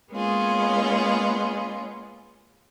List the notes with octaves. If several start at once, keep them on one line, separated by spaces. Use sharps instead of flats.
G#3 A#3 B3 C#4 F4 G#4